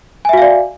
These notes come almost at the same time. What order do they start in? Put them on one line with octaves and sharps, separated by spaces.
G#5 E5 F#4 F5 D5